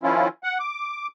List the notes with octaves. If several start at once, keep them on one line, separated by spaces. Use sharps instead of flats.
D#3 F3 C#4 E4 F4
F#5
D6